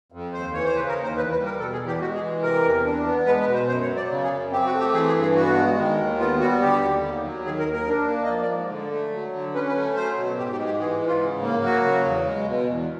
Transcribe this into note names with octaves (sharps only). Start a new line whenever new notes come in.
F2
D#2 C5
E3 C#5
C5
C#3 B4
A#4
D#2
C5
E2 B4
B4
G3
A#4
B2 A4
G#4
E2
G4
G#3 F#4
G#4
E3
C3 A#4
E2
D4
B3
G#3 B4
B4
B2
C5
F#2 C5
C#5
F#3
D5
C#3
G#4
F#2
C4 G4
F#4
A3
G4
E3 G#4
G#4
G2
G#4
B3 F#4
G#3
D#3
D#2
B3 F4
G3 F#4
D3 G4
D#2
D#2
F#3
D#3 G#4
A#4
D#2
A#4
D4
A#3
D#5
F3 D5
D5
G#2
D3
A3
F#3
D3
C#4 B4
B4
A3
F#3 C5
B2
G#2 G4
G4
G#3
G4
E3 G#4
G#2
F4
C#3
A#3
F#3 F#4
C#3
E2
G#3
B2
E2